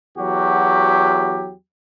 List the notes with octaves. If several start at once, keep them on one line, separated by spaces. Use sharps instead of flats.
E2 F#3 F#4 G4